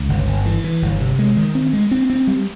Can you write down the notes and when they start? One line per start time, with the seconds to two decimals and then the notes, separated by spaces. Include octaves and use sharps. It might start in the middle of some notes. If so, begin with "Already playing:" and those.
Already playing: C#2
0.09 G1
0.27 G1
0.46 E3
0.64 E3
0.82 G1
1.00 C3
1.19 G#3
1.37 D#3
1.55 C4
1.73 G#3
1.91 C4
2.10 C4
2.27 G3